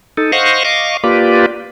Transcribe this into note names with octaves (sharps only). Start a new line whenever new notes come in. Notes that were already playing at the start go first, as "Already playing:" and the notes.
D#4 A4
C5 D#5 F5 F#5 C#6
D#5 F5 C#6 D6
A#3 F4 G4 B4 D5